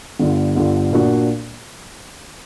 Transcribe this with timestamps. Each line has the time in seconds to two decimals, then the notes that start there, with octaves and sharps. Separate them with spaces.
0.19 G1 G2 D3
0.56 G1 G2 D3
0.92 A#2 A#3 D4 F#4